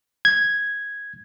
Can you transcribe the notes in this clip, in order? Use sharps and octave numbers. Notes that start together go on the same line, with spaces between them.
G#6